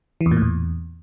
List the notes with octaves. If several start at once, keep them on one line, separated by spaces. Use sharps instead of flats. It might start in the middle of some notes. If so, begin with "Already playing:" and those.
E3
E2
A#2
A2
E2